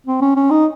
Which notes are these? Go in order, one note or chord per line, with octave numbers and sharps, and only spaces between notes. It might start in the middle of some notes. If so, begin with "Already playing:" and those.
C4
C#4
C#4
D#4